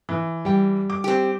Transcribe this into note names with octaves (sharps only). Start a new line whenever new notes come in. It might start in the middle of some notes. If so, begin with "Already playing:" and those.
E3
G3 G5
D6
C4 G4